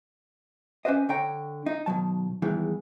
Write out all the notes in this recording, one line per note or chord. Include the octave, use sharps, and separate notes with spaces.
C#4 G4 B4 C5 D#5
D3 C#5 G5 A#5
D#4
B2 D#3 F#3 A5
E2 G2 D#3 E3 G#3